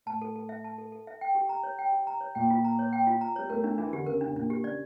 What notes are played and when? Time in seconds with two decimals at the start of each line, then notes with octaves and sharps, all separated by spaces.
0.06 A2 A5
0.22 A4
0.36 A4
0.49 E5
0.64 A5
0.78 A4
0.92 A4
1.07 E5
1.21 G5
1.35 G4
1.49 A#5
1.63 C#5
1.79 G5
1.92 G4
2.07 A#5
2.21 C#5
2.35 A#2 G5
2.50 F4
2.65 A#5
2.79 C#5
2.93 G5
3.07 F4
3.21 A#5
3.36 G3 C#5
3.50 A3 A#4
3.64 A3 D4
3.78 E3 D4
3.93 D3 G4
4.07 C#3 A#4
4.21 D4
4.26 C#3
4.35 A#2 D4
4.50 G4
4.64 C#3 D5